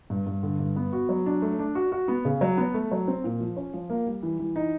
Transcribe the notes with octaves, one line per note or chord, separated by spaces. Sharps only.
G2
G2
D3
G2
B3
F#4
F#3
D4
A3
D4
F#4
F#4
B3
C#3
F#3
B3
A3
F#3
C4
A#2
F3
C#4
F3
A#3
G3
E3
E3
D#4